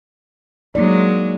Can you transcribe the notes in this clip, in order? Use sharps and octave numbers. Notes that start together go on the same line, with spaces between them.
F#3 G#3 A#3 D#4 D5